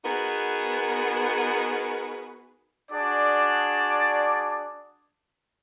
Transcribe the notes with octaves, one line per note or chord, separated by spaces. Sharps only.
B3 D#4 F#4 G#4 A#4 B4
D4 F#4 G#4 D5